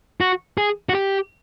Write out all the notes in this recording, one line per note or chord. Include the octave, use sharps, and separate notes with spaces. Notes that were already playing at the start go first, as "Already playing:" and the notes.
F#4
G#4
F#4
G4